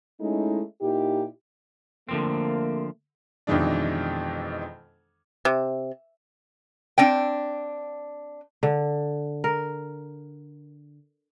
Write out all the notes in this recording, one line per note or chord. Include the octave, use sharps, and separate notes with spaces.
G#3 A3 C#4 D#4 E4
A#2 D#4 E4 G4
D3 F3 A3 A#3 C4
F2 B2 D#3 E3 G#3 D4
C3
C4 D4 G5
D3
A#4